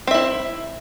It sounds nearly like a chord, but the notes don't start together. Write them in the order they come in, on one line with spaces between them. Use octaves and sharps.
C4 E5 E4